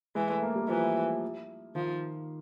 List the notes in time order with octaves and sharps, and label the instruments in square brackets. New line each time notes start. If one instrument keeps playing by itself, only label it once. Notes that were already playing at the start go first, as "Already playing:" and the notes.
[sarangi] E3 [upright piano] G#3
[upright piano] A3
A#3
G3
[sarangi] E3 [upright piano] F3
[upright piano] D#3 [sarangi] F3